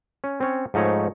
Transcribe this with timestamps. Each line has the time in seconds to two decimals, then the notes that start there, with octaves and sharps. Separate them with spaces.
0.24 C#4
0.40 C4 C#4 C#5
0.74 G#2 F3 A3 D#4 C#5